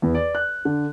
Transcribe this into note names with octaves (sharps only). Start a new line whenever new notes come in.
E2
D5
F#6
D3